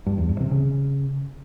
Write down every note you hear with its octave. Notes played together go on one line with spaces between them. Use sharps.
G2
E2
G2
C3
C#3